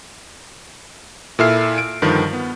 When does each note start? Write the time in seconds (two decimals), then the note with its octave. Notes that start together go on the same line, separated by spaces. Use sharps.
1.39 A#2 E4 A4 E5 F6 C7
1.78 D7
2.02 G2 D3 D#3 F3
2.33 B3